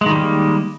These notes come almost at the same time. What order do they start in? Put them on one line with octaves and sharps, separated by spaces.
G#3 D#3 G3 A#3